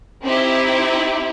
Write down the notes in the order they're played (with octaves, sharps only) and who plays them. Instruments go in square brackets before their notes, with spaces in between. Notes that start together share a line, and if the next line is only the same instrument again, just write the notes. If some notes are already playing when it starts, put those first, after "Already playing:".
[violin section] C4 D#4 E4 G4